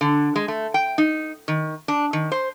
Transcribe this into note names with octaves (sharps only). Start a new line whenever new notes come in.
D3
G#3
A3
G5
D#4
D#3
D4
D#3
C5